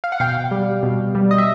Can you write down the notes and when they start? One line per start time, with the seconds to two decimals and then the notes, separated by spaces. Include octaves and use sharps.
0.04 F5
0.12 F#5
0.20 B2 F5 G5
0.51 G3
0.83 B2
1.15 G3
1.31 D#5
1.38 E5